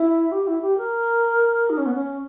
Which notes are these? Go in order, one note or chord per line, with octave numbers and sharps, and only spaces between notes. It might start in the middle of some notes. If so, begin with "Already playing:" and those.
Already playing: E4
G4
E4
G4
A#4
D#4
C#4
B3
C#4